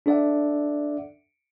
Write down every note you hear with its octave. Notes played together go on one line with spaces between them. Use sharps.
D4 A4 D5 E5 F#5